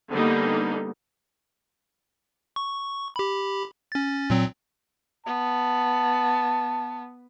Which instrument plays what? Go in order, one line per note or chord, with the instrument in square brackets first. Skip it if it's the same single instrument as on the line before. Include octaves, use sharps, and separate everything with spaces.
[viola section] D3 G3 A#3 B3 D#4
[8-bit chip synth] C#6
G4 B5
C#4 A6
A#2 F#3 C4
[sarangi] B3 [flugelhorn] A5